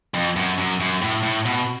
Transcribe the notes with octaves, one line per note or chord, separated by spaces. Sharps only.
F2
F#2
F#2
F#2
A2
A2
B2